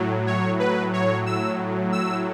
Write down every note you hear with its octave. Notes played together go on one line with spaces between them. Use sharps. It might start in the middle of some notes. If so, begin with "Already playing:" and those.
Already playing: A2 F#3
C#5
B4
C#5
E6
E6